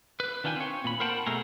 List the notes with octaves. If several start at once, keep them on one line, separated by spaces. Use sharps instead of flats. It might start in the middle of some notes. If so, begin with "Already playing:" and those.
B4
D#3 D4 F4 G5 G#5
C4 C#5
A#2 B5
A#4 C5 F#5 G5 A5 B5
B2 A3 G#4 A#4